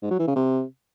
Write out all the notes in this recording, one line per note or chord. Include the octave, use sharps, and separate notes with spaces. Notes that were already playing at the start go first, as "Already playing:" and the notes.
G#2
F#3
E3
C#3
C3